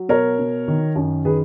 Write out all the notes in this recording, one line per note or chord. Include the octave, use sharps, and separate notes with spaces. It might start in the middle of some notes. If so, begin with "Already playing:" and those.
Already playing: F#3
B2 A#4 C#5
B2
D#3
F#2
D#3 G#4 B4